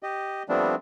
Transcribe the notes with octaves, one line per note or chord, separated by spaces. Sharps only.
G4 D#5
F3 G3 A3 B3 C4 D4